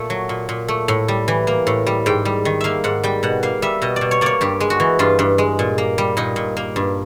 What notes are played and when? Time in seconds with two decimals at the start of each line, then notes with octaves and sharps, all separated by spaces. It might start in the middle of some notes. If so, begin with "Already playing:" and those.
Already playing: A#2 A3
0.10 F#3
0.29 A#2
0.49 A#2
0.68 A3
0.88 A2
1.08 G3
1.28 E3
1.47 A#3
1.67 A2
1.87 G3
2.06 G#2 G5
2.25 G3
2.45 D#3
2.61 A#3 E5 F5
2.84 G#2 F#5
3.04 G3 G5
3.23 B2 F#5
3.43 A#3 F5
3.62 G3 E5
3.82 B2 D#5
3.96 D5
4.01 B2
4.11 C#5
4.21 A#3 C#5 D5
4.41 G2 G4
4.60 G#3
4.70 F#4
4.80 E3
4.99 G2 F4
5.19 G2
5.38 G#3
5.59 A#2
5.78 A#3
5.98 G3
6.17 A#2 D#4
6.36 A#2
6.57 A#3
6.76 G2